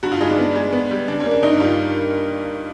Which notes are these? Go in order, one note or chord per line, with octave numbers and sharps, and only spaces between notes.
G2 F#4
F4
G#3 D#4
D4
B3
G#3
B3
G3
C#3 D4
C#4
A#3
D4
G2 D#4
G3 F4